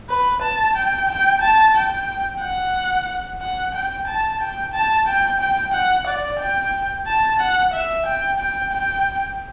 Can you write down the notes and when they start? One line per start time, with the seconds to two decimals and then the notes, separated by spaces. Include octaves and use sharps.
0.10 B4
0.42 A5
0.76 G5
1.09 G5
1.42 A5
1.76 G5
2.42 F#5
3.42 F#5
3.75 G5
4.08 A5
4.41 G5
4.74 A5
5.07 G5
5.41 G5
5.74 F#5
6.08 D5
6.40 G5
7.07 A5
7.40 F#5
7.74 E5
8.07 G5
8.40 G5
8.73 G5